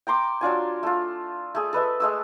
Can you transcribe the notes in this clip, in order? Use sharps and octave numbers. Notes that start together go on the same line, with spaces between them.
G5 A#5 C6 D6
F#3 D4 F4 G#5
A3 F4
A3 G#4
A4 B4 D#5 E5
G#3 A3 E6